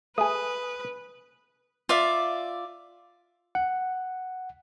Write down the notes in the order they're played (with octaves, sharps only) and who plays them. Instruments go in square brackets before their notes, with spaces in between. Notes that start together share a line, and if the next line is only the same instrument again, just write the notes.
[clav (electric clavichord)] A3 G#4 [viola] B4 [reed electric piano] D#6
[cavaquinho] F4 D5 E5
[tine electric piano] F#5